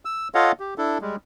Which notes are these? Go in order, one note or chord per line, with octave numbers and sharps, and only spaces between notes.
E6
F4 A4 C#5 D#5 F5 F#5
G4
D4 E4 A4
G3 G#3